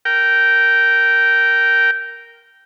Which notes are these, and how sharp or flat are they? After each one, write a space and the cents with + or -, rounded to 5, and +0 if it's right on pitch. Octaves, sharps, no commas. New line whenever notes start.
A#4 +0 G5 -15